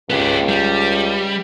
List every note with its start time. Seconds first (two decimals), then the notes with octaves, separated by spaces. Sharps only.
0.10 C#2 B3 G4
0.49 G3